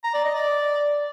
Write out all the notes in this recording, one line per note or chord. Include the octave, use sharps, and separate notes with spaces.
A#5
D5
D#5
D5